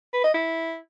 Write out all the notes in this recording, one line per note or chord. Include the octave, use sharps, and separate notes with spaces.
B4
D#5
E4